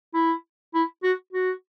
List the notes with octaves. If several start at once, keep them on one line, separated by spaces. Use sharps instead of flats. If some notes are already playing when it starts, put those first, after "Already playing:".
E4
E4
F#4
F#4